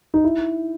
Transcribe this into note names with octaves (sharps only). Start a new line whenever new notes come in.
D#4
E4